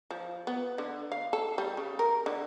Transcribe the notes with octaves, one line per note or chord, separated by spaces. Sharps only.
F3
B3
D3
F5
A4
G3
C#3
A#4
D3